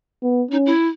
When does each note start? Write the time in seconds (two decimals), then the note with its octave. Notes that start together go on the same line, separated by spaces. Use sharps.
0.23 B3
0.51 C#4 D#4
0.66 E4